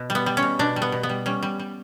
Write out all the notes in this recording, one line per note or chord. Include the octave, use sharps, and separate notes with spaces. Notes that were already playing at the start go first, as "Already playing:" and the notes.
Already playing: B2
G3
B3
G3
C#4
B2
B2 D4
G3
B3
B2
B3
G3
G3 C#4
G3
G3